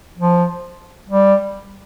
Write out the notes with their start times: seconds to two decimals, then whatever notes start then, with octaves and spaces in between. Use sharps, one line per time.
0.18 F3
1.08 G3